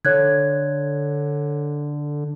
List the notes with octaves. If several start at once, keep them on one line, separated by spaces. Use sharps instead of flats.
D3 C#5 F#6 G#6